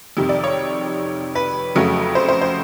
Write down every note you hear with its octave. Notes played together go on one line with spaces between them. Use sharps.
F2 C3 D#3 G3
D5
C#5
B4
F2 C#3 F#3 A3
C5
C5
C5